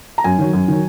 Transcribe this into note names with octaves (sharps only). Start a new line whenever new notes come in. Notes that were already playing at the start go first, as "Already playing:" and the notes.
A#5
F#2 G#5
D#3 F#3
F#2
D#3 F#3